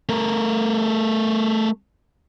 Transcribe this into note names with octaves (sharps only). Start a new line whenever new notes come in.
A3 A#4